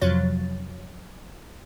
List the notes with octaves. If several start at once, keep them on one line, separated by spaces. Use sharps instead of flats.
F2 C3 F3 F#3 C#5 A6